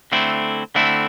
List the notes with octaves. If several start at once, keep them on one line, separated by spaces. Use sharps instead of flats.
D3 A3 C4 E4
D3 A3 C4 E4